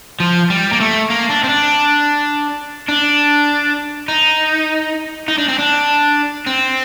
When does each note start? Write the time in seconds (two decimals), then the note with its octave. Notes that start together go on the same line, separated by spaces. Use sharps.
0.20 F3
0.50 G3
0.73 A#3
0.80 A3
1.10 A#3
1.30 D4
1.44 C4
1.49 D4
2.88 D4
4.08 D#4
5.28 D#4
5.38 D4
5.48 C4
5.58 D4
6.47 C4